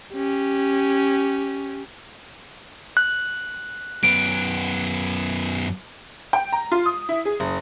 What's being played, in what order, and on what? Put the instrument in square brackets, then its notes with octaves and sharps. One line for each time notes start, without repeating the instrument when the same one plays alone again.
[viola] C#4 G4
[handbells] F#6
[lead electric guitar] F#2 B3 [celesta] D7
[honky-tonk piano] G5
A#5
F4
D#6
E4
G#4
F#1